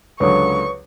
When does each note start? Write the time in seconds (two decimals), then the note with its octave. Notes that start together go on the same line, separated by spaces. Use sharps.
0.20 C#2 D3 F#3 B4 C#5 C#6 D#6